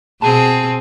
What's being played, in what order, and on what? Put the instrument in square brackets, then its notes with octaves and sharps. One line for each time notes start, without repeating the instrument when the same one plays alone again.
[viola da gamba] B2 C4 G#4 [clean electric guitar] A5